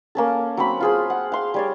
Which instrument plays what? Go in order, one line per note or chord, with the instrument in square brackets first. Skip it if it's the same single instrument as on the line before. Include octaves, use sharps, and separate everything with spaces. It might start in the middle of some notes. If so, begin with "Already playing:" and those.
[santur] A#3 C#4 A4
F#3 C4 B5
F4 G#4 C5
F#5
F5 C6
G3 C#5 D5